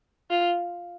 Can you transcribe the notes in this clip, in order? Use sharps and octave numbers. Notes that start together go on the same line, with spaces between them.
F4